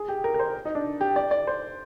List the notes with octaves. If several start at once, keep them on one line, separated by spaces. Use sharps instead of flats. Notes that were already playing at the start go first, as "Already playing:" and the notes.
Already playing: G#4
G4
A#4
A#4
C5
D#4
D4
G4
D5
D5
C5